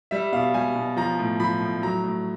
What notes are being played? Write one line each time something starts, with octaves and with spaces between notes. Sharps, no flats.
G3 E5
B2 F5
G3 G#5
B2
F3 A#5
A2
F3 B5
A2
F#3 A#5
A2